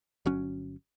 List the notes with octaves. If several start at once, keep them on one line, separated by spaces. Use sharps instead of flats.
G1 F#3 C#4